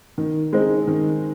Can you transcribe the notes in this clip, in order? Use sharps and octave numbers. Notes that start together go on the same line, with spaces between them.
D#3
G#3 C4 D#4
D#3